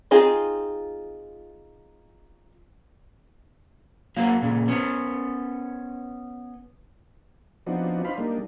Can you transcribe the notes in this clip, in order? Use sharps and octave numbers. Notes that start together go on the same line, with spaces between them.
C4 D#4 F4 G#4
F#3 A#3 F5
A#2 C#3
B3 C#4
F3 B3 C4 D4 D#4 F#4
D4 D#4 C5 F5 B5
G3 A#3 D4 D#4